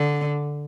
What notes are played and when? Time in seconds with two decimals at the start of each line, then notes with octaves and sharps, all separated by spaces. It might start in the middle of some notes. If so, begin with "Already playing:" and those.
Already playing: D3